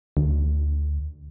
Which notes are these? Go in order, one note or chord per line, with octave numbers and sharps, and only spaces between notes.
D2